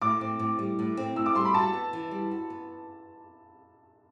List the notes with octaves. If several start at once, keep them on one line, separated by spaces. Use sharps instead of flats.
A2 D6
C4
A2
G3
A2
C4
A2 E6
D6
G3 C6
B5
F#4 A5
B3
E3
G3
F#4
B3